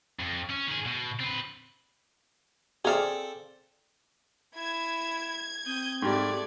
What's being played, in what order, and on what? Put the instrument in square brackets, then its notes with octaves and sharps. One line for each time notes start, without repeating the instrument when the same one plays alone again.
[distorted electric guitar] F2
C#4
D#3 G#4
B2
C4 B4
[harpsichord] C4 A4 D5 [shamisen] G#4 F5
[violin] E4 E7 [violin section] G#6
[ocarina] C4 [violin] D#6 G6
[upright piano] G#2 G3 [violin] A3 D5